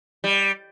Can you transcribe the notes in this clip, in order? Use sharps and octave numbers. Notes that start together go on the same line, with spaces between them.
G3